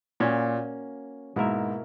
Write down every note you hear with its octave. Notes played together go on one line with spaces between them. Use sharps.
A#2 A#3 C#4 F#4 C#5
G#2 B2 A#3 E4 A#4 E5